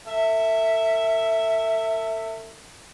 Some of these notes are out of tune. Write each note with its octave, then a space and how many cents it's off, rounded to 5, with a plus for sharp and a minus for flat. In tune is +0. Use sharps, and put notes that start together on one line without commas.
A4 +40 E5 +0